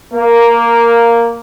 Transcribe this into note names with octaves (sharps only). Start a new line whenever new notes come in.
A#3